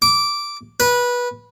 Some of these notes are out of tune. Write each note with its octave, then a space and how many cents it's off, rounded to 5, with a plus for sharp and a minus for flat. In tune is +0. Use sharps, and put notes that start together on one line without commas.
D6 -10
B4 -20